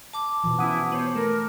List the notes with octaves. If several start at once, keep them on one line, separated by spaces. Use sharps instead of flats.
A5 D6
B2 E3 F3
C#4 E4 F#5 D#6
B3 C5 C#5
A3 A#4